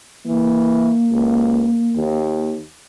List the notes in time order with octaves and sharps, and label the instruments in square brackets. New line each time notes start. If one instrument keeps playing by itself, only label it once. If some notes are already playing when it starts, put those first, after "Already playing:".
[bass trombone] E3 [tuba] A#3
[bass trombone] C#2
D#2